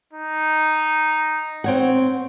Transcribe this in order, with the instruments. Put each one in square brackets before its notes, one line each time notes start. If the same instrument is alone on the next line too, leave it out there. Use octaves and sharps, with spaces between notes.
[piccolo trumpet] D#4
[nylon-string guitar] C4 C#5 F#5